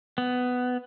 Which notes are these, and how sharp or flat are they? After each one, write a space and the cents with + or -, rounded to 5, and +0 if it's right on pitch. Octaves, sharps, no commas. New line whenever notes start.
B3 +10